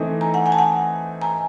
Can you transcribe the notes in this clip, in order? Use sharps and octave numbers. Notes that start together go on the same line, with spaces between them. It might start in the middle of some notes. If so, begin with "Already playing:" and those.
Already playing: E3 A3 C4 D#4
G#5 A#5
F#5 G#5
F#5 G#5
A5
F#5 G#5
G#5 A#5